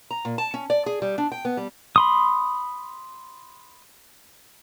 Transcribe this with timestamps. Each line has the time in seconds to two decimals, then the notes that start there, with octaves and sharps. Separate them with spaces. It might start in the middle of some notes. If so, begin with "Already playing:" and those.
0.11 A#5
0.25 A#2
0.38 A5
0.54 C#4
0.70 D5
0.86 G#4
1.02 G3
1.18 D4
1.32 G5
1.45 B3
1.57 G3
1.96 B5 C6 D#6